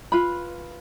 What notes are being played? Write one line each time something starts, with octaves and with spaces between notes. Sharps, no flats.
F4 B4 B5